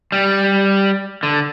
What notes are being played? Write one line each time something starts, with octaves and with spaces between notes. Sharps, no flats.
G3
D3